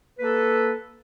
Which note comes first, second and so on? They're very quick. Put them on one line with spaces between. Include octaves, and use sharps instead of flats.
B4 A#3 A4